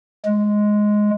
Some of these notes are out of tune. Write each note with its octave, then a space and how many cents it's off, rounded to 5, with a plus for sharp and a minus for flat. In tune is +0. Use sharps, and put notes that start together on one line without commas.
G#3 +5